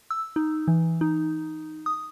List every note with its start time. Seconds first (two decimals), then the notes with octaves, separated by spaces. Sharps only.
0.11 E6
0.36 D#4
0.68 E3
1.01 D#4
1.86 D#6